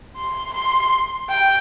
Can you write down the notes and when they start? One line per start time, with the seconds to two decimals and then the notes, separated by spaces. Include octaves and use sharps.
0.17 C6
0.54 C6
1.29 G5